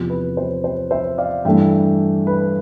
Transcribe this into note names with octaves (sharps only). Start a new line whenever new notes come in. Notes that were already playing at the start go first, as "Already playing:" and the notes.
Already playing: E2 C3 F3 B3 F4
B4
C5
C5
C5 E5
D5 F5
G2 E3 A3 D4 E5 G5
B4